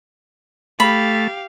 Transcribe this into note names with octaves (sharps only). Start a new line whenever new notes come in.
A3 G4 F5 B5